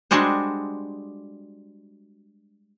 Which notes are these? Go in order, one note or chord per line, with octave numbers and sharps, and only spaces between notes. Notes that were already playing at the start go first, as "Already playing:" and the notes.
G3 G#3 D4 F#4 G#4 C5